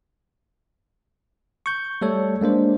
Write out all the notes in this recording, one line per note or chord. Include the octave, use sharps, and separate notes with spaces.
C#6 G6
G3 A3 A4 C#5
G#3 A#3 D4 C5